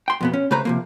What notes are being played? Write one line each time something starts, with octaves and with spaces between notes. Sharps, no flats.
G5 C6
F2 B2 B3
C#4
C#3 A3 B4 C5 A#5
C3 F3 A#3